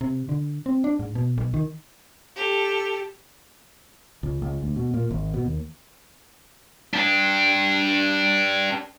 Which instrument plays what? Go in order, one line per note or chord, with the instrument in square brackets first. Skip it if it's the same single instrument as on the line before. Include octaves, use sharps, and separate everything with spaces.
[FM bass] C3
D3
C4
D4
G#2
B2
B1
D#3
[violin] G4 A4
[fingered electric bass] C#2
C#2
D2
B2
A#2
G#1
B2
D#2
[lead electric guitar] D4 G4